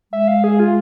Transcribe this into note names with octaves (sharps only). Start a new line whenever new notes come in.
G#3 E5
F5
G#4
F4